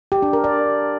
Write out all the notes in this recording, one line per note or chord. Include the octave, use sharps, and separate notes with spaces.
G4
D4
A#4
D5